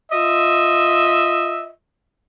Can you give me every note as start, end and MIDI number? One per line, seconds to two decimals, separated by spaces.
0.12 1.70 65
0.12 1.70 75
0.12 1.70 76